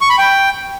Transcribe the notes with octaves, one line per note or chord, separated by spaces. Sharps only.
C#6
B5
G5